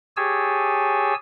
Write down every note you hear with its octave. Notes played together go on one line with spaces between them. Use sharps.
G4 G#4 C#5 G#5 A5 E6